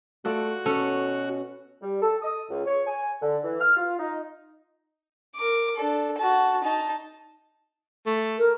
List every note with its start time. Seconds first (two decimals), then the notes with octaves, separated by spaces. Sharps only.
0.25 A3 F4 F#4 A4 D5
0.66 B2 C#4 A4
1.82 G3
2.02 A4
2.22 D#6
2.49 C#2
2.65 C#5
2.87 G#5
3.22 D3
3.44 E3
3.60 F6
3.77 F4
3.99 D#4
5.36 A#4 D6
5.76 D4 A4
6.18 F#4 A5
6.64 D#4 A5
8.06 A3
8.38 A#4